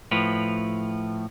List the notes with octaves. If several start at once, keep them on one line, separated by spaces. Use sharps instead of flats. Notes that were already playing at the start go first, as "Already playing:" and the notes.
A2 F3 B4